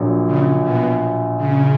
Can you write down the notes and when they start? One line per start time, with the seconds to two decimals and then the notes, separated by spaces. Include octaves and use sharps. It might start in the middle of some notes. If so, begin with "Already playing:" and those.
Already playing: A#1 A#2 F#3
0.26 C#3
0.62 B2
1.37 C#3